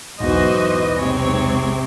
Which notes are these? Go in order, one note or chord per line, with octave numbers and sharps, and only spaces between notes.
B1 E2 G#2 E3 F#4 C5 D#5
C3 G#3 C4 C#5